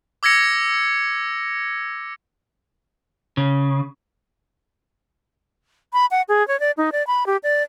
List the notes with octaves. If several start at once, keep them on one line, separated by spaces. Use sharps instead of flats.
D6 E6 G#6 A#6 C#7
C#3
B5
F#5
G#4
C#5
D5
D#4
D5
B5
G4
D5